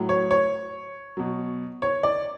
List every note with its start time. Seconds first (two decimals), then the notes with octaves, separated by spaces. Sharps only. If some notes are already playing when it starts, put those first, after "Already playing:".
Already playing: A2 F#3
0.09 C#5
0.31 C#5
1.17 B2 F#3
1.82 C#5
2.03 D5